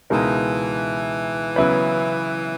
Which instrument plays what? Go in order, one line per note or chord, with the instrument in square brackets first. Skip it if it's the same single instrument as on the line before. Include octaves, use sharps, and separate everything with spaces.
[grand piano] C#2 B2 G#3 D#4 A#4 [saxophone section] E3
[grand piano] C#3 F#3 B3 E4 B4